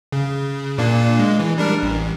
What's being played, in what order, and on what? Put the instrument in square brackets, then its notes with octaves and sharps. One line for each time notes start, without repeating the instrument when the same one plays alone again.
[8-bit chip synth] C#3
A#2 A#3 D4
G#3
E3
G3 D4 A#4
A1